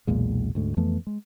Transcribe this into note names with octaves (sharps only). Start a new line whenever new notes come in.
B1 E2 A#2 G#3
D2 G#2 A3
F2 E3 A3 B3
G#3